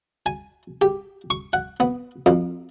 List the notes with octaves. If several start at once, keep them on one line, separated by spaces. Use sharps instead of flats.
G#5
G4
C#6
F#5
B3
F2